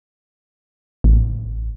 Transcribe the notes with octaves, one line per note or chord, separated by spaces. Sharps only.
A1